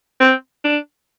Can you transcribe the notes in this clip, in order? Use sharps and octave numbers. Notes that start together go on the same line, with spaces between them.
C4
D4